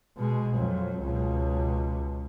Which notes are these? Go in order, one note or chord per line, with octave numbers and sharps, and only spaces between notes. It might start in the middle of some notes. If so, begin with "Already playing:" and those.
B2 G#3
F2 F#3
C#2 B2